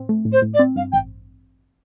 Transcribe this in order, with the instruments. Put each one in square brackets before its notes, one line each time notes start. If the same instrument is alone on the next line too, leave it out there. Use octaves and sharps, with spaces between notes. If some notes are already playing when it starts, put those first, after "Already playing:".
Already playing: [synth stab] A2 C4
A3
A2
[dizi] C5
[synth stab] A2
[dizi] D5
[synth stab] C4
[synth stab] G2 [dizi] F5
[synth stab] A1 [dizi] G5